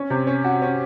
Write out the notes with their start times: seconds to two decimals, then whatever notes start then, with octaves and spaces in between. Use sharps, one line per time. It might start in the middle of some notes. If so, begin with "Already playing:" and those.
Already playing: C#4
0.10 C3
0.27 C#4
0.44 F#4
0.62 C#4